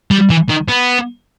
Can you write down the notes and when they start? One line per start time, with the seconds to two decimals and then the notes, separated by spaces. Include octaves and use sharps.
0.11 G3
0.30 E3
0.49 D#3
0.68 B3